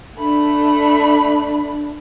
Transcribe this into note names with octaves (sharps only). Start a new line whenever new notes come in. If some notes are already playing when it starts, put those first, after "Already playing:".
A3 D4 B5